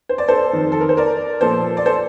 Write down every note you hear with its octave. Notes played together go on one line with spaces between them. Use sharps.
C5
D5
A4 C5
F2 D#3
A4
A#4
C5
A#4 D5
A#2 F3 A4 C5
D5
A4 C5